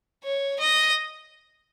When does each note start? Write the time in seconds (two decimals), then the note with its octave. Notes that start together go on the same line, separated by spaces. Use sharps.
0.24 C#5
0.59 D#5